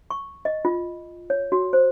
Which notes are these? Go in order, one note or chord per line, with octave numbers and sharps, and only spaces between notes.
C#6
D#5
F4
C#5
F#4
C5